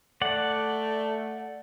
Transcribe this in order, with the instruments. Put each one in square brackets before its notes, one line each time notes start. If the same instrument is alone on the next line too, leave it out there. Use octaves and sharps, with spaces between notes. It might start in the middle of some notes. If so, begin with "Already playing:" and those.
[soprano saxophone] A3 [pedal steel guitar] D5 F#5